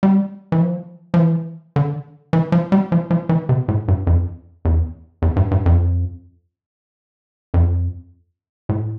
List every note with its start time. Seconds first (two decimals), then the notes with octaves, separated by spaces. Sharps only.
0.03 G3
0.52 E3
0.60 F3
1.14 F3
1.18 E3
1.76 D3
2.33 E3
2.52 F3
2.72 G3
2.92 F3
3.11 F3
3.29 E3
3.49 C3
3.68 A2
3.88 G2
4.07 F2
4.65 E2
5.22 E2
5.36 G2
5.51 G2
5.66 F2
7.54 F2
8.69 A2